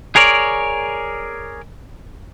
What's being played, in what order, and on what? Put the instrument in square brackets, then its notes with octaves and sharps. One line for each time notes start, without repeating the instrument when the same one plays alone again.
[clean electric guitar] G#4 A#4 C#5 D5